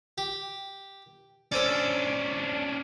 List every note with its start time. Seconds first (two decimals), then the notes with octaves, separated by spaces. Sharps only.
0.18 G4
1.52 C#4 D4 A4 C5 D5